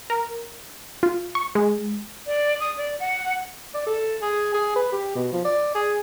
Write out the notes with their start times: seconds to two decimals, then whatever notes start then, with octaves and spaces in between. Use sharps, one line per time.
0.10 A#4
1.03 F4
1.35 C#6
1.55 G#3
2.27 D5
2.60 D#6
2.77 D5
3.00 F#5
3.74 D5
3.86 A4
4.21 G#4
4.54 G#4
4.76 B4
4.92 G4
5.15 B2
5.32 F3
5.45 D5
5.75 G#4